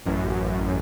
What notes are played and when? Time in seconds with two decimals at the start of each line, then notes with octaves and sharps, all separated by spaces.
0.05 A1 F#2